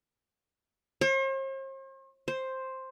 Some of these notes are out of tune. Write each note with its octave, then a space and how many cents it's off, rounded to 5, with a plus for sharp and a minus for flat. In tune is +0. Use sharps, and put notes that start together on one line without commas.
C5 +45
C5 +5